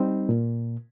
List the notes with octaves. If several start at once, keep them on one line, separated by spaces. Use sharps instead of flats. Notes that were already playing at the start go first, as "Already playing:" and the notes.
Already playing: G3 C4 D#4
A#2